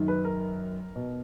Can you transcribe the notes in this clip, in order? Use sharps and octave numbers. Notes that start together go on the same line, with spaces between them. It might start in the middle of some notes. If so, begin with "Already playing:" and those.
Already playing: F#2 D#3
B4
A#4
B2